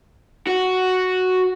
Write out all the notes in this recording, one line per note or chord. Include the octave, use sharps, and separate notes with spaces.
F#4